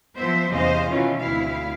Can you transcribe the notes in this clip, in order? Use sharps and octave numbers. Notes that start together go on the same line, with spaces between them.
F3 B3 C5 E5
E2 C3 C#4 C5 D#5 F5
B2 D#3 E3 C#4 F4
D2 C4 E4 F5